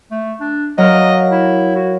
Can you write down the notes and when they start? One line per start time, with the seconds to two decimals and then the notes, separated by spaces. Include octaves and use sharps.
0.11 A3
0.40 D4
0.78 F#3 A#4 D#5 F5
1.31 E4
1.75 F#4